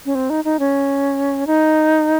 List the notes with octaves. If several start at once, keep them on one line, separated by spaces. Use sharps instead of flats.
C#4
C4
D#4
D#4
C#4
D#4